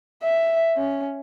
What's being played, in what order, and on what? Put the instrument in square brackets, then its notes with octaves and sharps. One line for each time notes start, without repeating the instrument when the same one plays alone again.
[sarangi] E5
C#4